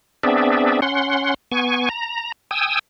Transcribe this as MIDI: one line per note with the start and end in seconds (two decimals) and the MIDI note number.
0.23 0.80 59
0.23 0.80 60
0.23 0.80 62
0.23 0.80 68
0.23 0.80 74
0.23 0.80 76
0.82 1.34 61
0.82 1.34 78
0.82 1.34 84
1.51 1.89 59
1.51 1.89 80
1.51 1.89 85
1.90 2.32 82
2.51 2.79 79
2.51 2.79 80
2.51 2.79 87
2.51 2.79 88